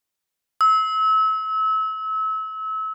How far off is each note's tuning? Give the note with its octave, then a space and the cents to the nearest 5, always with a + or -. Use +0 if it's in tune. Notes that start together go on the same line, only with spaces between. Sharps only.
E6 -30